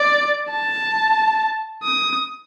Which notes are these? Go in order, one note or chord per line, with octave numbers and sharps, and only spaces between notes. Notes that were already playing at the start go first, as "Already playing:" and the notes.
Already playing: D5
A5
D#6